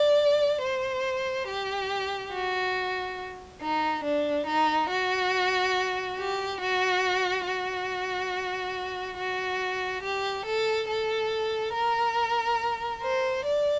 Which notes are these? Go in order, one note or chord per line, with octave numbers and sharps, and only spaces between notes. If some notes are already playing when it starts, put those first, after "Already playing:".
Already playing: D5
C5
G4
F#4
D#4
D4
D#4
F#4
G4
F#4
F#4
F#4
G4
A4
A4
A#4
C5
D5